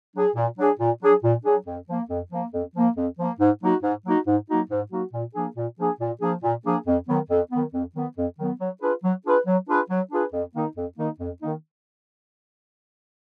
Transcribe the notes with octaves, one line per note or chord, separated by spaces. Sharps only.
F#3 D4 G#4
A#2
F#3 D4 G#4
A#2
F#3 D4 G#4
A#2
F#3 D4 G#4
F2
F3 A#3
F2
F3 A#3
F2
F3 A#3
F2
F3 A#3
G#2
F#3 A#3 D#4 F#4
G#2
F#3 A#3 D#4 F#4
G#2
F#3 A#3 D#4 F#4
G#2
F#3 A#3 D#4 F#4
A#2
F3 A#3 D4 G#4
A#2
F3 A#3 D4 G#4
A#2
F3 A#3 D4 G#4
A#2
F3 A#3 D4 G#4
F2
D#3 F#3 B3
F2
D#3 F#3 B3
F2
D#3 F#3 B3
F2
D#3 F#3 B3
F#3
D4 F4 G#4 B4
F#3
D4 F4 G#4 B4
F#3
D4 F4 G#4 B4
F#3
D4 F4 G#4 B4
F2
D#3 A#3 D#4
F2
D#3 A#3 D#4
F2
D#3 A#3 D#4